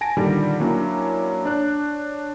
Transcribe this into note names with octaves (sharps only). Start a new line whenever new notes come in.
G#5 A5 A#6 D7
A#2 D3 D#3 G3
F#3 A#3 C#4 D4 E4
D4 C#5 F#6